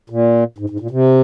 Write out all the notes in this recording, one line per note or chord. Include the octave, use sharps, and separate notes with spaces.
A#2
G#2
G#2
A#2
C3